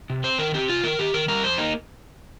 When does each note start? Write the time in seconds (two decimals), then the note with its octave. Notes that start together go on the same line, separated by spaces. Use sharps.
0.10 C3
0.24 C4 C5
0.38 D#3 A#4
0.53 C4 G4
0.69 C3 F4
0.83 D#3 A#4
0.99 D#3 G4
1.14 D#3 A#4
1.28 G3 A#4
1.43 F2 C5
1.58 A#3 D#4